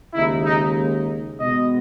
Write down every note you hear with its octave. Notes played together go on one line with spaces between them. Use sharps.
D#2 C#3 G#3 D#4 E4
D#4
B2 G#3 B3 D#5